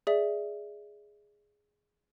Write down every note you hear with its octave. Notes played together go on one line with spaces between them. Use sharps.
G#4 D5 E5